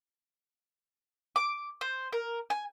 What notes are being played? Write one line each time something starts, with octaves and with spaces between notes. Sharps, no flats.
D6
C5
A#4
G#5